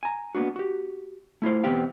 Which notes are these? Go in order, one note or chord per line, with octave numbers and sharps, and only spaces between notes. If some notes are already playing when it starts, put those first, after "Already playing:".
G#5 A#5
A#3 B3 D4 F#4
F#4 G4
A3 E4 F4 C5
E2 B2 B3 C4 G4 F5